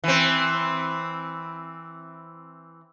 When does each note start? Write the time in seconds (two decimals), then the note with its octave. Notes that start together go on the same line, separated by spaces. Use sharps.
0.04 E3 C4